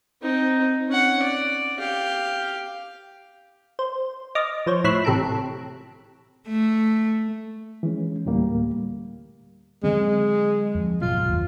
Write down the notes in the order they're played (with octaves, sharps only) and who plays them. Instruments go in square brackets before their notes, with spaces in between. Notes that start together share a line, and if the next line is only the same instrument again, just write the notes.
[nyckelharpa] C4 D#4
C#4 F#5
D5
G4 F5
[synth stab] C5
D#5 D6 F6 A6 A#6
F3 C5 C#5
A2 C#5 B5 E6 F#6 C7
A1 C3 A4 A#5 D7
[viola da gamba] A3
[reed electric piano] E3 G#3 C#4
D2 A2 G3 A#3
[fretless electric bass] D3 F#3 C4 [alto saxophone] G#3
[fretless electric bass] F2
[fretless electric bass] G#1 B2 F#3 [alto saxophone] F4
[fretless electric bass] F#1 D#2